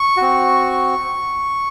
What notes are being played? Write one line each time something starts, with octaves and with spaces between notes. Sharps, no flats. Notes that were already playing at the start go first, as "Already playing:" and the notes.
Already playing: C#6
C4 F#4